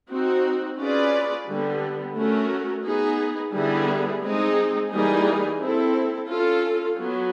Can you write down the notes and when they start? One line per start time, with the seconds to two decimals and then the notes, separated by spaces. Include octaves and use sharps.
0.09 C4 D#4 F#4
0.78 C#4 F4 G#4 B4 D5
1.47 D3 G3 B3
2.16 A3 C#4 F#4 A#4
2.85 B3 D#4 G#4
3.54 D3 G3 B3 E4 G#4
4.22 G#3 C4 D#4 G#4
4.92 E3 G3 A#3 D#4 G#4
5.60 C4 E4 A4
6.29 C#4 F4 A4
6.97 F#3 B3